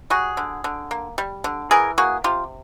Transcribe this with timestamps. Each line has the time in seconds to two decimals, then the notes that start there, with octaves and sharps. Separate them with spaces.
0.10 G3 F#4 G#4
0.37 D3
0.64 D3
0.91 A#3
1.18 G3
1.44 D3
1.71 E3 G#4 A#4
1.98 A#3 F#4 G#4
2.24 C3 F4 G4